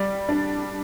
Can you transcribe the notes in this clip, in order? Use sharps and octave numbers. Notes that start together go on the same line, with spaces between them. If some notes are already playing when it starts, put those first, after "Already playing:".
Already playing: G3 D5
D4